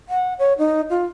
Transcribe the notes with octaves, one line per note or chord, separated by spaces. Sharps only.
F#5
C#5
D#4
F4